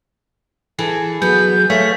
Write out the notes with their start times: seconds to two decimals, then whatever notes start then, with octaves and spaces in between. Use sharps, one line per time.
0.79 E3 G#4 A4
1.22 F#3 B3 G#4 G6
1.70 A3 C#5 F5 G#5 B6